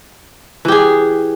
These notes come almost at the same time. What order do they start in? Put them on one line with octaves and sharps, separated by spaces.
E3 G4 G#4